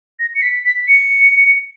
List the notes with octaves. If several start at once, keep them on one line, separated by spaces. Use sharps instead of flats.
A#6
C#7
B6
B6
C#7